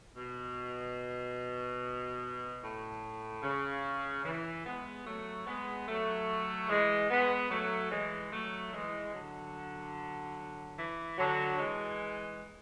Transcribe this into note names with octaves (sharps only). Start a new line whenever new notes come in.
B2
A2
C#3
E3
G#3 B3
F#3 A3
G#3 B3
F#3 A3
E3 G#3
G#3 B3
F#3 A3
E3 G#3
F#3 A3
E3 G#3
D3 F#3
E3
D3 F#3
E3 G#3